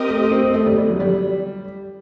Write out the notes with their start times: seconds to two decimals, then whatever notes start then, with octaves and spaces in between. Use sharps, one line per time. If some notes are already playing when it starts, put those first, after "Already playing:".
Already playing: C4 G4 A#4 D#5
0.09 A3
0.31 C4
0.54 A3
0.66 G3
0.77 G3
0.89 F#3
1.00 G3